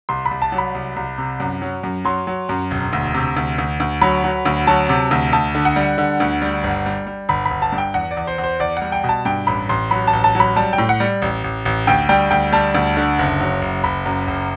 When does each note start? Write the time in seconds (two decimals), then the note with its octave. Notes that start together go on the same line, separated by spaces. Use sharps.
0.09 C2 C6
0.26 B5
0.31 C2
0.42 A5
0.52 F#3
0.58 B5
0.75 C2
0.96 C2
1.18 C3
1.40 F#2
1.62 F#3
1.83 F#2
2.05 F#3 C6
2.27 F#3
2.49 F#2
2.71 E1
2.93 D2
3.14 C3
3.36 D2
3.58 D2
3.80 D2
4.01 F#3 B5
4.24 F#3
4.45 D2
4.67 F#3 A5
4.89 C3
5.11 D2
5.32 D2 A5
5.55 D3
5.65 F#5
5.76 G3
5.98 D3
6.20 D2
6.42 G3
6.64 G1
6.86 G3
7.07 G3
7.29 G1 B5
7.45 B5
7.51 G1
7.62 A5
7.72 G2
7.78 G5
7.94 E2 F#5
8.11 D5
8.17 E2
8.27 C5
8.38 E2
8.44 C5
8.60 E2 D5
8.77 G3 F#5
8.92 G5
9.04 B2
9.09 A5
9.25 G2 G5
9.47 A1 B5
9.69 A1 C6
9.91 F#3 B5
10.07 A5
10.13 A1
10.24 A5
10.35 F#3
10.40 B5
10.56 G3 A5
10.73 G5
10.78 A2
10.89 F#5
11.00 G3
11.22 A1
11.44 A1
11.65 A1
11.87 D2 G5
12.09 G3 G5
12.31 D2 G5
12.53 G3 A5
12.74 D2
12.97 D3
13.19 F#1
13.41 F#3
13.62 F#1
13.84 F#1 B5
14.06 F#2
14.28 F#1